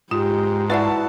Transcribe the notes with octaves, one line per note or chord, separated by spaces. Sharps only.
G#2 F4 G4
E4 F#4 B4 D5 F#5 A5